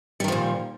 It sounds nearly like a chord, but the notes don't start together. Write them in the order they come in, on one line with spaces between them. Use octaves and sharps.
G3 D#3 F3 A#2